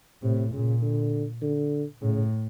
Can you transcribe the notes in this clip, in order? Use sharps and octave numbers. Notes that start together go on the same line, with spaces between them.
A2 C3
A#2 C#3
D3
D3
A2 C#3